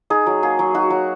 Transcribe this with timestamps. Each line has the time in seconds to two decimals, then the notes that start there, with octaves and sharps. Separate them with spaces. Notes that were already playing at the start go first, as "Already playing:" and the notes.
0.10 D#4 G#4
0.27 F#3
0.43 A#3 G#4
0.59 F#3
0.74 D#4 F#4
0.90 F#3